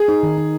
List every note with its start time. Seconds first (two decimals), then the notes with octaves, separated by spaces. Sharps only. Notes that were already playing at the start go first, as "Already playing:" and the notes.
Already playing: G#4
0.08 D#4
0.23 D#3
0.38 D#4